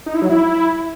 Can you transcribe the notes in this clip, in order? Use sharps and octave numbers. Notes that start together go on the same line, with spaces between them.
D#4
E4
F#3
E4